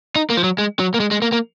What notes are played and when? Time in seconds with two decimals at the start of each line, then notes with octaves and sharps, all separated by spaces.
0.16 D#4
0.30 A#3
0.37 F3
0.44 F#3
0.58 G#3
0.79 F#3
0.94 A#3
1.00 G#3
1.11 G#3
1.22 A#3
1.32 A#3